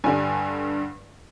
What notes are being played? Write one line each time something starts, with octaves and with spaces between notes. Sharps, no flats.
G2 D3 G3 G#5